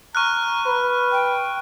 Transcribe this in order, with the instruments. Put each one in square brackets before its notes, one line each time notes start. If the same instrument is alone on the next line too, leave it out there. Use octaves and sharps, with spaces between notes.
[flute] A#5 [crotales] C#6 F6 F#6
[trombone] B4
[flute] G5